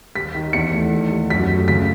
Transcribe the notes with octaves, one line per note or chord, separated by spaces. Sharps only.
D#2 B6
D#3
E2 C#7
A3
D#3
D#2
F#2 B6
A3
C#3 B6